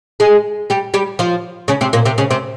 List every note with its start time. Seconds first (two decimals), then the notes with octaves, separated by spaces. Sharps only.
0.20 G#3 G#4
0.70 G3 G4
0.94 G3 G4
1.19 F3 F4
1.68 C#3 C#4
1.81 C3 C4
1.93 A#2 A#3
2.05 C3 C4
2.18 C#3 C#4
2.31 C3 C4